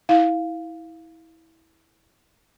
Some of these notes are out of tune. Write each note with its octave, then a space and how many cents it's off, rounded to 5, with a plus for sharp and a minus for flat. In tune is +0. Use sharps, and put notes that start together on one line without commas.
E4 -20 F5 +0